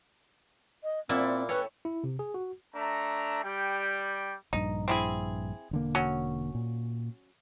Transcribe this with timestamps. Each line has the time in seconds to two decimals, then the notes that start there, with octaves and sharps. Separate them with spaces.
0.84 D#5
1.10 A#2 C4 E4 F#4 D5 E6
1.49 A3 C#4 G4 B4 C#5
1.85 E4
2.04 C3
2.19 G#4
2.34 F#4
2.75 A3 D4 A#5
3.44 G3 G5
4.53 A#1 G2 D#4
4.88 C4 E4 G#4
5.71 E1 D3 A#3
5.95 F#3 C#4
6.55 A#2